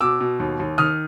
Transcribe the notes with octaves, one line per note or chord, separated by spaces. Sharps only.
B2 D6 E6
B2
D#2
D#2
D#3 D#6 F6